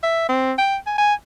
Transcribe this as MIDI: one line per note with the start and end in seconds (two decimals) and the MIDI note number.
0.03 0.26 76
0.29 0.53 60
0.59 0.77 79
0.87 0.98 80
0.98 1.14 80